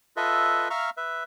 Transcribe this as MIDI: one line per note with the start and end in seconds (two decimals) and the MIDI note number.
0.17 0.68 65
0.17 0.68 69
0.17 0.68 71
0.17 0.68 75
0.17 0.68 76
0.70 0.90 76
0.70 0.90 77
0.70 0.90 82
0.70 0.90 85
0.70 0.90 89
0.97 1.24 71
0.97 1.24 76